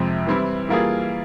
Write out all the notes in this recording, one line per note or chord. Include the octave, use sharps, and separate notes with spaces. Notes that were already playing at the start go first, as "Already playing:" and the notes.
Already playing: F2 C3 F3 G#3 C4
E3 G3 C4 E4
E3 G3 A#3 F4 G#4